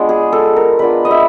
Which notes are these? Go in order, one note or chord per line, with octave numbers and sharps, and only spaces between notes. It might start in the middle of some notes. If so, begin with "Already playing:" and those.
Already playing: G#3 B3 D4 F4
G#4
A4
A#4
G#3 B3 D4 F4 B4
D#5
E5